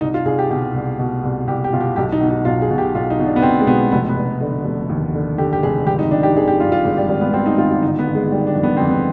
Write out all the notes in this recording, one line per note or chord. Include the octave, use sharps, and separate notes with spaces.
C2 D#4
F4
C2 G#4
G4
B2 G4
C2
B2
C2
C2 G4
G4
B2 F4
G4
B1 G4
D#4
B2
D#4
B1 F4
G#4
B2
G4
B1 F4
D#4
B2
D4
B3
B2 C4
G#3
B2 B3
F1 B3
B3
F1
D3
F1
D#2
D3
D3 G4
G4
F1 G#4
G#1 G4
D#4
D#3 D4
G4
G#1 G#4
G4
G2 F4
F4
G#1 G#3
G3
G#1 G3
B3
G#1 C4
D#4
G#1 F4
F4
G1 D#4
B3
G1
G#3
D#3 G3
D4
F2
B3
F2 C4
B3